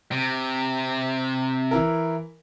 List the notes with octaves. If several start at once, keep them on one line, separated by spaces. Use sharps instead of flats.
C3
E3 E4 A#4